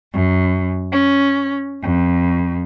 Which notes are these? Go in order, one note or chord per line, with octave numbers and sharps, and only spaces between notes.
F#2
C#4
F2